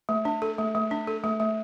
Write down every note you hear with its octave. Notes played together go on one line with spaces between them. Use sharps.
A3
D4
A4
A3
A3
D4
A4
A3
A3